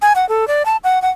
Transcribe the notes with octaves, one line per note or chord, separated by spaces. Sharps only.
G#5
F#5
A4
D5
A5
F#5
F#5